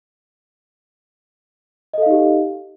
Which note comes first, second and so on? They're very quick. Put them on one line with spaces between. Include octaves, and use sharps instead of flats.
D#5 A4 F5 D#4 G4